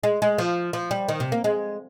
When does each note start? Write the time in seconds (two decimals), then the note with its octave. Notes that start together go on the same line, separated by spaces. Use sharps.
0.03 G#3
0.22 G#3
0.38 F3
0.73 F3
0.91 G3
1.08 D#3
1.20 C3
1.32 A#3
1.44 G#3